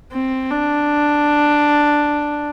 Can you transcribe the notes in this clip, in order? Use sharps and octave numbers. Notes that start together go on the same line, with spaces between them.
C4
D4